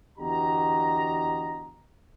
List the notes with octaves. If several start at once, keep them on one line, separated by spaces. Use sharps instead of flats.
E2 D3 F#4 G4 D#5 A#5